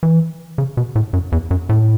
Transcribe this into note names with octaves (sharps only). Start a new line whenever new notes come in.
E3
C#3
B2
A2
F#2
E2
F#2
A2